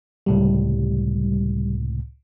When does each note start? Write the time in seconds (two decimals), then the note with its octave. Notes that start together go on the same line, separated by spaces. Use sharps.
0.26 C#2 A2 C3 G3